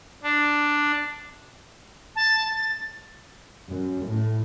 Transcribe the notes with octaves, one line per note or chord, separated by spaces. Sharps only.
D4
A5
A6
F#2
A2